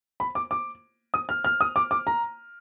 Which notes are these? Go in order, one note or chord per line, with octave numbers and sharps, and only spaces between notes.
B5
D6
D6
D#6
F6
F6
D#6
D6
D6
A#5